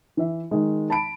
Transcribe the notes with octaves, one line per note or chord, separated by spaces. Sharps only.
E3 E5
D#3 G#3
A5 B5 D7